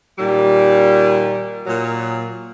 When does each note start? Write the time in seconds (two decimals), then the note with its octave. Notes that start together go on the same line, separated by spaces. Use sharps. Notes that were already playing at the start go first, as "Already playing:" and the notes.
0.18 A#2 D#3 G3
1.67 A#2 F#3